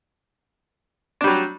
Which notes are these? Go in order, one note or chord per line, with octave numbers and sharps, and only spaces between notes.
F#3 G3 D4